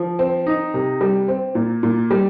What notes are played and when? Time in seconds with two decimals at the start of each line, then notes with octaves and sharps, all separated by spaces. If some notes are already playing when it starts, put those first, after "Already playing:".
Already playing: F3
0.19 C4
0.47 D#4
0.74 C3
1.01 G3
1.28 C4
1.55 A#2
1.83 A#2
2.11 G3